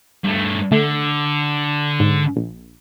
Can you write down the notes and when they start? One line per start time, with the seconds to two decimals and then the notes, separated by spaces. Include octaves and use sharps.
0.24 G2 A3
0.72 D3 A3
2.00 G#2
2.36 A#1